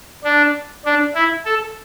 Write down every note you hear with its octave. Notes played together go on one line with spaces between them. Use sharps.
D4
D4
E4
A4